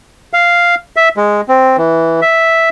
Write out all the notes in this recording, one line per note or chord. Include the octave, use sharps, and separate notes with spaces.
F5
E5
G#3
C4
E3
E5